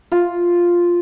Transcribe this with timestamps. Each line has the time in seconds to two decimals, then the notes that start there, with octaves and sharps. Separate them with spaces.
0.12 F4